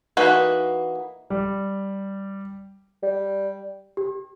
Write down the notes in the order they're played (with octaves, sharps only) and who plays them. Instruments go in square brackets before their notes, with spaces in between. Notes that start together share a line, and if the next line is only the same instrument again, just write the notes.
[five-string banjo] E3 A#3 D#4 F#4 B4
[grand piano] G3
[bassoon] G3
[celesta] G4